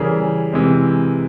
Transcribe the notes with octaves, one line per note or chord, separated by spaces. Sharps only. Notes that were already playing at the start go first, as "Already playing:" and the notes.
Already playing: C#3 E3 G3 G#4 A#4
C3 E3 G#3 C4